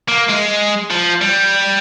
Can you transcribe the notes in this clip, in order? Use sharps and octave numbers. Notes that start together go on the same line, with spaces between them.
A#3
G#3
F3
G3